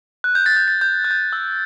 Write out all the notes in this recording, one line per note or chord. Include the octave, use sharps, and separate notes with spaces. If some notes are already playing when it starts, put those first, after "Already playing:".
F#6
G6
A6
G6
A6
G6
F#6
G6
E6